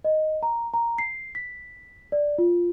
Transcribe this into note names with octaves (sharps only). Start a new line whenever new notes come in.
D#5
A#5
A#5
C7
B6
D5
F4